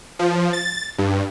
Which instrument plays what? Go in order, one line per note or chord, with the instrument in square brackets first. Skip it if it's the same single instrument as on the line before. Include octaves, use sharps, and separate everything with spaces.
[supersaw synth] F3
A6
G2